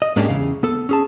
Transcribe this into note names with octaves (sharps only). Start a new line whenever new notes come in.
D#5
G#2 G#3 A#3 C#4 D4 G4
E2 C#3 F5
B3 A4
C#4 G#4 A5